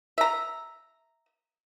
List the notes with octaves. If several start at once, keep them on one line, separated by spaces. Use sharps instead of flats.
E5 A#5